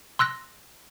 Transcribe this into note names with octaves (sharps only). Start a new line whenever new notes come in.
C6 E6 F#6 A#6